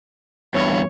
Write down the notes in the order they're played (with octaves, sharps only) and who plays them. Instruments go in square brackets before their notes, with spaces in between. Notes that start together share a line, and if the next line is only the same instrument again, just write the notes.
[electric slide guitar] E2 G2 [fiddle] C#5